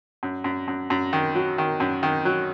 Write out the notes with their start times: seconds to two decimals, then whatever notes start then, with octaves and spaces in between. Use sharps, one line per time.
0.23 F#2
0.44 F#2
0.68 F#2
0.90 F#2
1.13 D#3
1.35 F#3
1.58 D#3
1.80 F#2
2.03 D#3
2.25 F#3